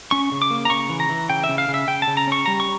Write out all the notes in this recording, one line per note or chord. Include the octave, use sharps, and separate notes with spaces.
C#4 C#6
C#3
D6
A#3
A#5
C#3 C#6
E3
A#5
E3
C#3 G5
E5
C#3
F5
C#3
E5
C#3 G5
A5
C#3
A#5
C#4 C#6
G3 A#5
C#6